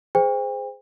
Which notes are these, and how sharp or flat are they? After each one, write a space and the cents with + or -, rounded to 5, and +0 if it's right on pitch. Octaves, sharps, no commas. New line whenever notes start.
G#4 +0 C5 -20 G5 +40